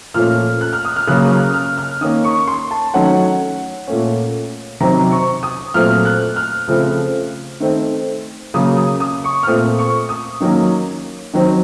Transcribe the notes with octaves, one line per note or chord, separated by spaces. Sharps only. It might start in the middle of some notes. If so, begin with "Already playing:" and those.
A#2 F3 A3 C#4 F6
F#6
F6
D#6
F6
C#3 F#3 A#3 C#4 F#6
D#6
F6
F6
F6
D#3 A#3 C#4 D#6
C#6
C6
A5
D#3 F#3 A3 C#4 F#5
A#2 A3 C#4
C3 D#3 F#3 C4 A#5
C#6
D#6
A#2 F#3 A3 C4 F6
F#6
F6
C#3 F3 A3 C4
D#3 A3 C4
C#3 F#3 A#3 C#4 D#6
D#6
D#6
C#6
F6
A#2 A3 C4 D#6
C#6
D#6
D#3 F#3 A#3 C#4
D#3 F#3 C4